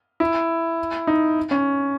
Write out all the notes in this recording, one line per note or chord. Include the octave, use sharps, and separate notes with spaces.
E4
D#4
C#4